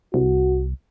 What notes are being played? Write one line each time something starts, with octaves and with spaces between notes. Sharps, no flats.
C2 F#4